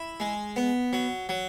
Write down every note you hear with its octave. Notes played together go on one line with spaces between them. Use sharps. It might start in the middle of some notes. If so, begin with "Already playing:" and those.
Already playing: E4
G#3
B3
F#3
F#3